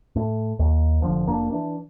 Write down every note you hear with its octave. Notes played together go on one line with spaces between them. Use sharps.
A2
D#2
F1 D3 F3
F1 A#3 D4
E3 D4